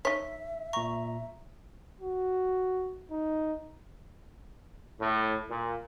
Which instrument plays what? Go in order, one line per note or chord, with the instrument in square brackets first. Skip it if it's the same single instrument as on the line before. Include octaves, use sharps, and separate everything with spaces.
[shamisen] D#4 C#5 [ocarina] E5 [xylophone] B6
[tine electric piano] A#2 A#5 [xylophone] C#6
[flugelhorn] F#4
D#4
[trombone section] A2
A#2